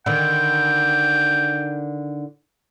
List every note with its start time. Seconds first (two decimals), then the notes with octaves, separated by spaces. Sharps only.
0.06 D3 D#3 G5